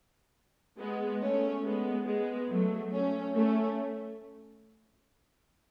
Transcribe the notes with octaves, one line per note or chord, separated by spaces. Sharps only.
G#3 B3
A3 C#4
G#3 B3
G#3 B3
F#3 A3
A3 C#4
A3 C#4